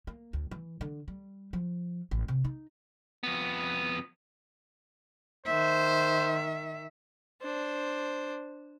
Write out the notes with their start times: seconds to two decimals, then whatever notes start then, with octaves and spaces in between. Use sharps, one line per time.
0.07 A#3
0.33 D2
0.51 E3
0.81 D3
1.08 G3
1.53 F3
2.11 A1
2.28 C3
2.44 D#4
3.23 F2 B3
5.46 D#3 C5 E5
7.42 D4 C5